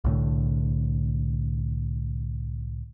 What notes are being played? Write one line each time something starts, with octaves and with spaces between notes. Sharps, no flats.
C2 A2 D3